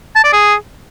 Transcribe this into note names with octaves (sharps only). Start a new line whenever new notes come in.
A5
D5
G#4